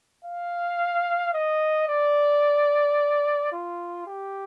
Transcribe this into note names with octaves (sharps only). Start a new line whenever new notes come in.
F5
D#5
D5
F4
G4